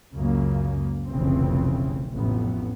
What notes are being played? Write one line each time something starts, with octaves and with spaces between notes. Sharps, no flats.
C#2 F#2 C#3 A#3
F1 B1 C#3 E3 C4
A1 F2 A2 B3